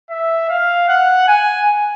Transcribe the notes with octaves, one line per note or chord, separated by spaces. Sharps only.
E5
F5
F#5
G#5